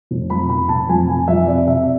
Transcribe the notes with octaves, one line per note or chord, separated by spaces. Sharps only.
F1
F2 B5
F1 B5
F1 A5
F2 G#5
C3 G#5
F2 E5
C3 D5
C3 E5